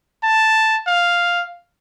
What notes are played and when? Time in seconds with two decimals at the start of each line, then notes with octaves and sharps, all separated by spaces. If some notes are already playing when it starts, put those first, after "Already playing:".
0.23 A5
0.87 F5